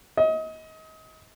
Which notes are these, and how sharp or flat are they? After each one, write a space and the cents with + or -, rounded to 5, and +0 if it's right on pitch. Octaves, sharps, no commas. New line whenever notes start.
D#5 +30